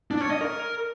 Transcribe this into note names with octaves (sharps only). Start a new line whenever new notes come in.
D4
C#5
D#5
A#4